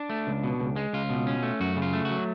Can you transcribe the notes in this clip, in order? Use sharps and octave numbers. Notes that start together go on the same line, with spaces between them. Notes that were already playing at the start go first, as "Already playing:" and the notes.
Already playing: D4
A3
C#2
B2
C#2
G#3
C#2 F4
B2
C#4
A3
F#2 F#4
C#3
F4
A3
F#4
F#3